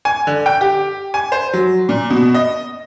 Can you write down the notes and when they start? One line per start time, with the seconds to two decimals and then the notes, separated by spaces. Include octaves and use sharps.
0.05 G#5
0.27 D3
0.46 G5
0.61 G4
1.14 G#5
1.32 C5
1.53 F#3
1.89 A#2
2.10 B2
2.34 D#5